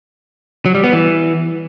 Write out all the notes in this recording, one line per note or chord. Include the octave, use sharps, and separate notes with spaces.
F#3
G3
B3
E3